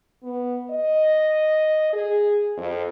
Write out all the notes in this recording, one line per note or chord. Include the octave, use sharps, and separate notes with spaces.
B3
D#5
G#4
F2